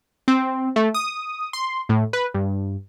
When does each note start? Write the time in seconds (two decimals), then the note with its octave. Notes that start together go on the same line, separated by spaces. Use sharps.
0.28 C4
0.76 A3
0.94 D#6
1.53 C6
1.89 A2
2.13 B4
2.34 G2